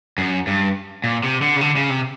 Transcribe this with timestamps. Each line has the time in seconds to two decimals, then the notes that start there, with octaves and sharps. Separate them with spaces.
0.18 F#2
0.47 G2
1.04 A#2
1.24 C3
1.42 D3
1.56 C#3
1.61 D3
1.76 C#3
1.90 C3